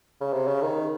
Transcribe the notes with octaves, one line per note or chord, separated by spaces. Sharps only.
C#3
C3
C#3
D#3